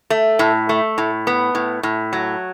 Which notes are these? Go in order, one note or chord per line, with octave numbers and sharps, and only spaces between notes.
A3
A2
A3
A2
B3
A2
A2
F#3